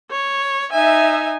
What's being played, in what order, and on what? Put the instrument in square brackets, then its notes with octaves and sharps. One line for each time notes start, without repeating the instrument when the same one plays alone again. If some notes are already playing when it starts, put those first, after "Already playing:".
[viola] C#5
[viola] D#4 G#5 [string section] E5